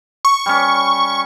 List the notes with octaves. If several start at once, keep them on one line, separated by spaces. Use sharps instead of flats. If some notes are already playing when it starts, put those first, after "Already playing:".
C#6
G3 C#4